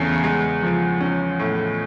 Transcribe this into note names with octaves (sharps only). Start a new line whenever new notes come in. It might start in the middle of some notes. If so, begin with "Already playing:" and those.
Already playing: E2 C#3 A3
G#3
F3
C#4
A2